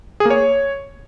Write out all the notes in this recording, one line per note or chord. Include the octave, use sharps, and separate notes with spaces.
G#4
A#3
C#5